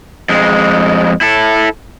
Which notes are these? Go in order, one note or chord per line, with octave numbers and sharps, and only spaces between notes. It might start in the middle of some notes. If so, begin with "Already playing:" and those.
F2 G#3
E4 A4